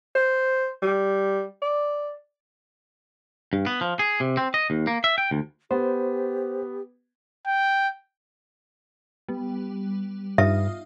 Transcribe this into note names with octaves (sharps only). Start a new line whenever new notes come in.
C5
G3
D5
G2
B3
F3
G#4
C3
C4
D#5
D#2
A#3
E5
G5
D2
B3 G4 C5
G5
G3 B3
G2 D#4 F4 E5 D#6